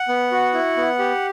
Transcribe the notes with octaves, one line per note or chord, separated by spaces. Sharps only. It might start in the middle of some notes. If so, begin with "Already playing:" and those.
Already playing: F#5
B3
F#4
E4
B3
G4